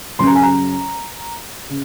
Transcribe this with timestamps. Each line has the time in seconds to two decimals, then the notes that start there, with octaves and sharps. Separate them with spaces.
0.19 F#2 C#3 F#3 C#4 C6
0.27 A#5
0.35 G#5
0.42 A#5
1.69 C#3